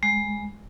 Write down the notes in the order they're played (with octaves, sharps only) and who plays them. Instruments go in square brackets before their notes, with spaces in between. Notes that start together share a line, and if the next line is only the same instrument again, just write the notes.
[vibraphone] G#3